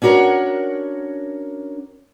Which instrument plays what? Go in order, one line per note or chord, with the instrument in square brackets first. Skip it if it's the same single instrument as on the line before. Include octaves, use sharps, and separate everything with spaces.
[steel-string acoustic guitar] C#4 D4 F#4 A#4 C#5